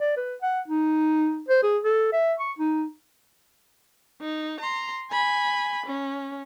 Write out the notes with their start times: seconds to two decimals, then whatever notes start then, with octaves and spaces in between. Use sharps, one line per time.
0.01 D5
0.17 B4
0.42 F#5
0.68 D#4
1.48 C5
1.63 G#4
1.84 A4
2.13 E5
2.39 C#6
2.59 D#4
4.21 D#4
4.60 A#5 C6
5.11 G#5 B5
5.86 C#4